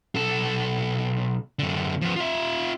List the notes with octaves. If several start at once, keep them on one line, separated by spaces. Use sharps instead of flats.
B1 A4
F#2 D3
F3 B3
F4 E5